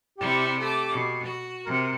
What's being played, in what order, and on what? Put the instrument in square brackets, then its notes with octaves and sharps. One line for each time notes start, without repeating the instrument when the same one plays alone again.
[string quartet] C3 G3 E4 [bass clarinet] G4
[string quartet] A3 D6
B2
F#4
[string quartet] C3 [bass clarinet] A#4